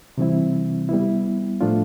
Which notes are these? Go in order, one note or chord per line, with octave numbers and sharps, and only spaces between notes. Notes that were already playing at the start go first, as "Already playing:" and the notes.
C3 E3 G3 C4 E4
G3 B3 E4
A2 F3 A3 D4 F4